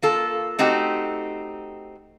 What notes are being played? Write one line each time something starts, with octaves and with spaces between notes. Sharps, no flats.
A#3 F4 A4
A3 C4 D#4 F#4 G4